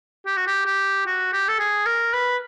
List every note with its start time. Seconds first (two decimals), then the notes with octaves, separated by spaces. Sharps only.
0.26 G4
0.37 F#4
0.47 G4
0.66 G4
1.07 F#4
1.33 G4
1.48 A4
1.59 G#4
1.86 A#4
2.13 B4